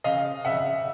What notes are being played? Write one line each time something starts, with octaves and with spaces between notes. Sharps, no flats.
C#3 D#5 F5
C#3 E5 F#5